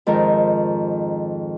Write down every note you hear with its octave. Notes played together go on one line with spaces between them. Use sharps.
F2 G#2 D#3 A#4